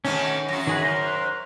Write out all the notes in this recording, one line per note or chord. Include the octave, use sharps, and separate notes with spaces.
B2 D#3 A3 C#4
F#2 F#4 A#6
D#3 G#4 B4
A#4 C5
F#6